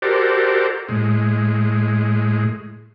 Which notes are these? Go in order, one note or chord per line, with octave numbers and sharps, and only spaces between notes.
F#4 G4 A4 A#4 C5 D5
A2 G#3